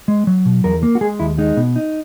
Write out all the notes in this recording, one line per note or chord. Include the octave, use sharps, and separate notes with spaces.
G#3
F#3
B2
E2 A#4
A#3
F#4
G#3 G#4
D#2 E4
G#3 D#4
B2
D#4